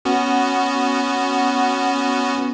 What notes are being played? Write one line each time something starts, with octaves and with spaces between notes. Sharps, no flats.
B3 C#4 F#4